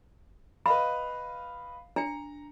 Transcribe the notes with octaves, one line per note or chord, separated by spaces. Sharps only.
B4 D#5 F5 B5
D4 A#5 C#7